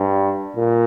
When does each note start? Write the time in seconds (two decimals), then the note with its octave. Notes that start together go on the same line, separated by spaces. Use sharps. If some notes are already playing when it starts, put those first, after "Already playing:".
Already playing: G2
0.56 A#2